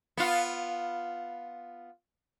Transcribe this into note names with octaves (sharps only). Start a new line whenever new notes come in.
B3 F4